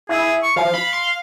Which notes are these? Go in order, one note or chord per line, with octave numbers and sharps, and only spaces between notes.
E4 G#4
C#6
F3 F5
B5
C6